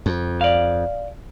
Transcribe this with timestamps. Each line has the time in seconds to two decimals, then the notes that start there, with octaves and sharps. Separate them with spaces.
0.06 F2
0.41 D5 F5